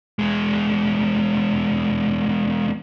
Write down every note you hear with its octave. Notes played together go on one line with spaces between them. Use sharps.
E2 G#3